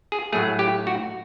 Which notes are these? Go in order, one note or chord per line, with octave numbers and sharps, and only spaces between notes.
G#4
A2 F#3 A3 G#4
G4
F#4